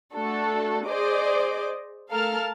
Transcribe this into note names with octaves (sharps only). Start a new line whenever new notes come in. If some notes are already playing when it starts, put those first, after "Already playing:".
A3 D4 F#4 A4
G#4 C5 D5 D#5 D6
A3 A4 A#4 F5 A5 F6